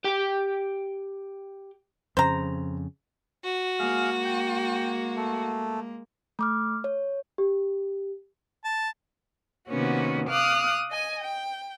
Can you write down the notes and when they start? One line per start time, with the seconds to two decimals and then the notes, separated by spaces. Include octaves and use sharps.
0.04 G4 G5
2.17 F2 C#3 C5 A#5
3.44 F#4
3.79 G#3 A#3 G#4 F5
4.25 G5
5.16 A3
6.39 A3 D6 F6
6.84 C#5
7.38 G4
8.64 A5
9.69 C3 D#3 A#3 B3 C#4 F#4
10.30 F5 D6 D#6 F6 F#6
10.92 D#5 G#5
11.24 G5